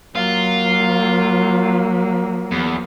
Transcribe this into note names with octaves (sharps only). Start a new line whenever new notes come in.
F#3 A#3 F4
E2